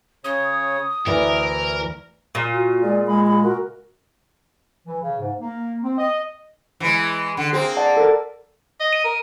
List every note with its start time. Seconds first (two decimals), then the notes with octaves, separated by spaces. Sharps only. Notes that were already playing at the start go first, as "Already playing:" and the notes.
0.24 C#3 C#5 D#6
1.07 D2 E3 E4 A#4 D5
2.35 A#2
2.53 F#4
2.82 G#3 G#4 D5
3.07 G#3 B5
3.27 B5
3.43 F#4 A#4
4.87 E3
5.01 C#3
5.19 G#2
5.39 A#3
5.82 C4
5.98 D#5
6.80 E3 G#3
7.37 D3
7.53 A#3 C4 G#4
7.77 D5 F#5 A5
7.97 A4 A#4
8.80 D#5
8.93 D#7
9.04 A#4